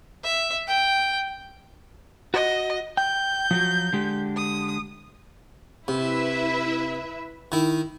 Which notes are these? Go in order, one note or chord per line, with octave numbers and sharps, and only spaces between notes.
E5
G5
F#4 D#5
G5 G6
F3 F#3 F#4
D3 G#3 G4
D#6
C3 E4 B4 E5
D#3 E4